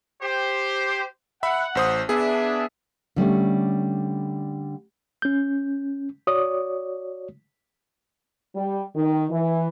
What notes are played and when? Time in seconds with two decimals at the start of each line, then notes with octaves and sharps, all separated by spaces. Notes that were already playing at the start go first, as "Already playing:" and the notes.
0.22 G4 C5
1.43 E5 F#5 B5
1.75 A1 C5 D#6
2.09 B3 D4 G#4 E5
3.16 D3 G3 A3 C#4
5.22 C#4 G6
6.27 F#4 C#5 D5 D#6
8.55 G3
8.96 D#3
9.31 E3